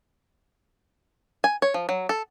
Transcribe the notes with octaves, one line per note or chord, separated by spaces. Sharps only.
G#5
C#5
F3
F#3
A4